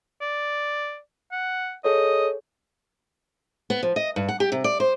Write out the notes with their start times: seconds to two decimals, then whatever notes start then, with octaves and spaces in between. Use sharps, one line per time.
0.21 D5
1.32 F#5
1.84 G#4 A4 C#5 D#5
3.70 B3
3.83 F3
3.96 D#5
4.16 G2
4.28 F#5
4.40 G4
4.52 C3
4.64 D5
4.80 C5